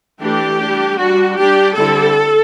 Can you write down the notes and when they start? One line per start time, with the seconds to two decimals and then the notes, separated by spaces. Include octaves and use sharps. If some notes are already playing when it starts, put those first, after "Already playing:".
0.20 E3 A3 D4 G4
0.59 G3 D4
0.98 G3 D4 F#4
1.37 G3 D4 G4
1.75 D3 G3 C4 E4 A4